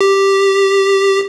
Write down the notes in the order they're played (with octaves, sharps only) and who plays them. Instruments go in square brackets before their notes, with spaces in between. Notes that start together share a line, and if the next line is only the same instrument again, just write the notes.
[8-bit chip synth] G4